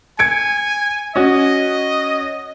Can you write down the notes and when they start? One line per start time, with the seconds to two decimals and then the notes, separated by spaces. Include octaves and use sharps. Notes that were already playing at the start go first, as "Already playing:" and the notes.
0.19 G#5 G#6 C#7 D7
1.16 C#4 F#4 D#5